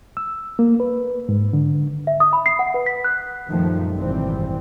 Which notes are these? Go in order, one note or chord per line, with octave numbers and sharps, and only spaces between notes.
E6
A#3
B4
G#2
D3
E5
D#6
B5
C7
F#5
B4
B6
F#6
F#2 A#2 D#3 F3 G3 A3
G#1 F#2 B2 E3 G3 C4